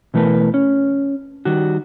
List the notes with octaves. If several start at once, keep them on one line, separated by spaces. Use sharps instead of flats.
B2 E3 A3 A#4 B4
C#4
D#3 G3 F#4